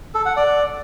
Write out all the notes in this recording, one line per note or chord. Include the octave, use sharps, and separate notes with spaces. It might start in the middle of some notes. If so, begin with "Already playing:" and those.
A4
F#5
D5